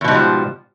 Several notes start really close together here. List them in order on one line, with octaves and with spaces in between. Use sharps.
E2 B2 G#2 G3 F3